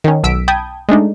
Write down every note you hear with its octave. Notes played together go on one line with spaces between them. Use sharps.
D#3 C#4
B1 E6 B6 D7
G5 A5 B5 D#6 G6 G#6
G#3 A3 D4 D#4